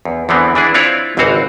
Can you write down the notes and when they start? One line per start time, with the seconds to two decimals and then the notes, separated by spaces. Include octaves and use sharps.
0.05 E2
0.29 E2 D3 E3 B3 C4
0.55 E3 D4 E4 G#4
0.74 C4 D4 E4 F4 C#5 D5
1.17 G#1 C#2 E3 C4 F#4 F5